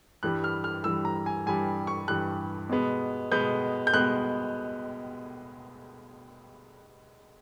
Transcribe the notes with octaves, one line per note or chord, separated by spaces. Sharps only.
G2 E3 G3 F#6
F6
F6
G2 E3 G3 E6
A#5
G#5
G2 E3 G3 G#5
C#6
G2 E3 G3 F#6
B2 G#3 B3
B2 G#3 B3 G6
G6
B2 G#3 B3 F#6